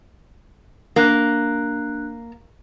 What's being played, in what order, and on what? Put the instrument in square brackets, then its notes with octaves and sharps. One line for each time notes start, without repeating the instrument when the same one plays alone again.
[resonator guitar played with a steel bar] A#3 [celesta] D4 F#6